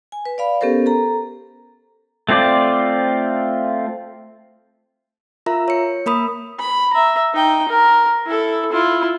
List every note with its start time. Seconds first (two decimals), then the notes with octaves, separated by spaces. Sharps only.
0.12 G#5
0.26 B4
0.38 D5 F5 B5
0.61 B3 C#4 G4 A4 A#4 C5
0.86 A4 A#5
2.29 A3 C4 F4 D5
5.46 F4 A#4 E5 A#5
5.68 C#5 C#7
6.06 A#3 A#4 B5 D#6
6.59 B5
6.93 E5 A#5
7.34 D#4 G5
7.69 A#4
8.26 E4 A4
8.72 E4 F4